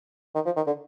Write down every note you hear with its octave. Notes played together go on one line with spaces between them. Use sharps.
D#3
F3
D#3
D3